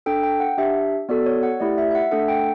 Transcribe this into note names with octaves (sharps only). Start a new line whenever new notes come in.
D4 A4 G5
G5
F#5
D4 G4 E5
B3 F#4 A4 D5
C#5
F#5
A3 E4 G4 D5
E5
E5
F#5
A3 D4 A4 F#5
G5